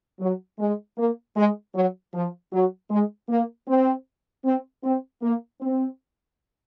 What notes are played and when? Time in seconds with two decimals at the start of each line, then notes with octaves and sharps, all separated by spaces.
0.20 F#3
0.59 G#3
0.98 A#3
1.36 G#3
1.74 F#3
2.14 F3
2.53 F#3
2.90 G#3
3.29 A#3
3.68 C4
4.45 C4
4.84 C4
5.22 A#3
5.61 C4